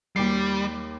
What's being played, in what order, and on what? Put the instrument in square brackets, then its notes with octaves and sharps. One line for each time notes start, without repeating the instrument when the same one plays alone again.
[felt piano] D#2 D6 C7 [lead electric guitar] G3